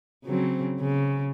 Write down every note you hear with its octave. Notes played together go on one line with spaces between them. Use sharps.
C#3 F#3 C4
C#3